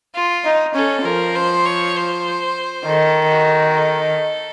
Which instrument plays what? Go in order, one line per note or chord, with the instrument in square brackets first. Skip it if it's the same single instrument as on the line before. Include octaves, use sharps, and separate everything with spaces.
[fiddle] F4
[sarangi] D#4
[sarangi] C#4 [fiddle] A4
[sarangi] F3 [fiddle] A#4
[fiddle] C5
C#5
C5
[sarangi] D#3 [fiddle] A4
[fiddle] F#4
A4